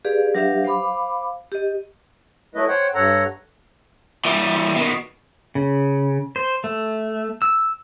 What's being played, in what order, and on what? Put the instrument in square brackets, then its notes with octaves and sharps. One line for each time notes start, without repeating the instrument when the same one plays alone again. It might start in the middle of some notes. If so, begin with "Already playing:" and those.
[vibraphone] G4 G#4 B4 D5 F5
F#3 D4 G4 B4 E5 F5
C5 F5 B5 D6
G4 D#5
[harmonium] F#3 A3 E4 B4 D#5
C5 C#5 F#5 G5
G2 A4 C#5 F#5 A#5
[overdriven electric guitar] E3 G3
B2 D#3
[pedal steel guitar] C#3
C5
A3
E6